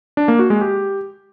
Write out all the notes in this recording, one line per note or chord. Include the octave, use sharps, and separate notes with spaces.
D4
A#3
F#4
G#3
G4